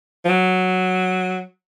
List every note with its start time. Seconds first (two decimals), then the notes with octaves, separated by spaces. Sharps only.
0.25 F3
0.29 F#3